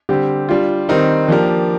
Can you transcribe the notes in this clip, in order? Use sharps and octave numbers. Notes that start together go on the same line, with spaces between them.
D3 G3 C4 G4
G3 D4 F4
D#3 G3 C4 D#4 A#4
F3 A#3 D4 G4 A#4